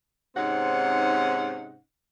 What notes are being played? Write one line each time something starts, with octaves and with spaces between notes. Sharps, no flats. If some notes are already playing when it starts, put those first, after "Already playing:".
G#2 C3 C4 C#4 D#4 F#5